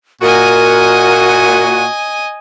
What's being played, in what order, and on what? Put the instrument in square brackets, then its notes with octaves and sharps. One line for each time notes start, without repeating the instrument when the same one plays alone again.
[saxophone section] A#2 F#4 [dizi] A#4 [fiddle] D#5 G#5